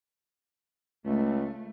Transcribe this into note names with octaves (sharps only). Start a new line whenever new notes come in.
C#2 A3